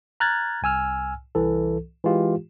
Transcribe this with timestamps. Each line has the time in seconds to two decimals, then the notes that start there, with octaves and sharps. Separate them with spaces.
0.20 A#5 F6 F#6 G#6 A6
0.63 C2 G#5 E6 F6
1.35 C2 E3 A4
2.04 E3 G#3 F4 G4